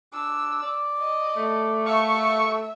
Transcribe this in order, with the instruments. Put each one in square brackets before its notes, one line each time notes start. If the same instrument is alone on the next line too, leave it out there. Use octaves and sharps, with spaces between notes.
[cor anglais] D4 [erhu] E6
[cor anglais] D5
[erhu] D#5
[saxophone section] A3
[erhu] E5 [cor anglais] F5 [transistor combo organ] C#6